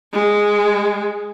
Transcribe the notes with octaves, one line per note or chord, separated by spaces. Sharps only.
G#3